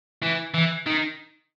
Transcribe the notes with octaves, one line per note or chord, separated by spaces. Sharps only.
E3
E3
D#3